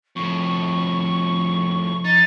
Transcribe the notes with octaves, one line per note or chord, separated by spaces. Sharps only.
F2 A2 F3 C#6
D#4 A6